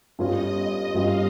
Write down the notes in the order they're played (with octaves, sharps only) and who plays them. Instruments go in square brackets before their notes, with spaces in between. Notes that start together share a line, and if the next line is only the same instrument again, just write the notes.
[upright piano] G1 G2 G3 C#4 F4 [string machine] D#5
[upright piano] G1 G2 G3 C#4 F4 [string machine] F5